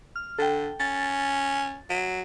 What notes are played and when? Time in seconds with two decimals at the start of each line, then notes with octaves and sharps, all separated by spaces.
0.16 F6
0.38 D3 A4 G5
0.80 C#4 A6
1.90 F#3